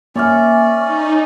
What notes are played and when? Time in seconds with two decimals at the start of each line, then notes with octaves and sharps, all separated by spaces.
0.16 A#3 C#4 C#5 D5 E5 G#5 F6
0.81 D#4 C#6